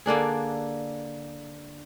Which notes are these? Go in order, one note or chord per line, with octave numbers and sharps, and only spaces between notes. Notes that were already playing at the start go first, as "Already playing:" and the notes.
D3 A#3 D4 G#4